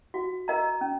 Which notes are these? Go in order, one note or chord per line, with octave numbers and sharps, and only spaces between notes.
F#4
A#4 D#5 A#5
C#4